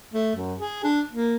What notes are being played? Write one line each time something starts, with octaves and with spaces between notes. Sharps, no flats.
A3
F#2
G#4
D4
A#3